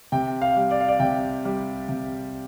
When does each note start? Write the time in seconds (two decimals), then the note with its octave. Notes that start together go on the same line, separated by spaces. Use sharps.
0.12 C3 G5
0.42 F5
0.56 G3
0.71 D5
0.81 F5
0.88 D5
1.00 C3 G5
1.45 G3
1.89 C3